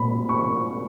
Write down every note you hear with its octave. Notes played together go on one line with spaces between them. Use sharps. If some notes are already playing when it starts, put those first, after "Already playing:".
Already playing: A#2 B5
C#6